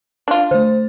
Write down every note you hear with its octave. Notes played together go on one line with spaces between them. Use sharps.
D4 F4
D3 A3 C5